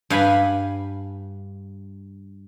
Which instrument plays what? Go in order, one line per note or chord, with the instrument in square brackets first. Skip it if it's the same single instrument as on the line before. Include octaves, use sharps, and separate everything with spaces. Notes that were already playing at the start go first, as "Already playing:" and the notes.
[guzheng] G2 F5 G#5 B5